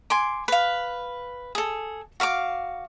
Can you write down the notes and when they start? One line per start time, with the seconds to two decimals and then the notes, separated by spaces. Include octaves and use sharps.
0.10 G#5 C6 D6
0.48 B4 F5
1.55 G#4 A4
2.20 F#4 F5 A#5 D6